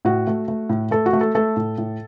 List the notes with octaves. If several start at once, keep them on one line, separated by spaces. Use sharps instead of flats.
A2 F#4
A3
A3
A2
A3 A4
F#4
A3
A4
A3 A4
A2
A2